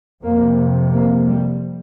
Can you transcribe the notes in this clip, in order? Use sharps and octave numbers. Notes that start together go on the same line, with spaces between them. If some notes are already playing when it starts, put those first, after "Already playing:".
F2 C3 A#3
A#3
G3